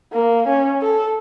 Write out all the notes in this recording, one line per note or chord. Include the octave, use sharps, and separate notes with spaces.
A#3
C#4
A4